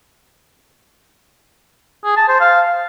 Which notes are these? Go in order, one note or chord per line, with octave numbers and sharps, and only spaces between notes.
G#4
A5
C5
F5